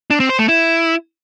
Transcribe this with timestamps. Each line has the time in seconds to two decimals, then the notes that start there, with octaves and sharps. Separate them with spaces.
0.10 D4
0.20 C4
0.29 C5
0.39 A3
0.48 E4